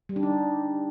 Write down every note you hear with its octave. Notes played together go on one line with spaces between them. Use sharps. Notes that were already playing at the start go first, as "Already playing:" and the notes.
G3
D4
D#4